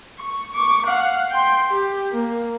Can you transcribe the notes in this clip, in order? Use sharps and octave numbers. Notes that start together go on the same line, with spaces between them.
C#6
C#6 D6
F5 F#5
G5 C6
G4
A#3